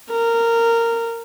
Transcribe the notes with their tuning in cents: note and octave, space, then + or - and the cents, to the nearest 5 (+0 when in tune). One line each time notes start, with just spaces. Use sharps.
A#4 -15